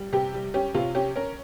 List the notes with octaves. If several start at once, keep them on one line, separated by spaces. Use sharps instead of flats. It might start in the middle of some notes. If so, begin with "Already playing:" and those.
Already playing: G3
C3 G4
G3
C#4 G4
C3 F4
C#4 G4
C#4 A#4